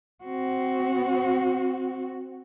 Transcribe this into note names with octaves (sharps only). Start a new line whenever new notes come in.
C4 F#4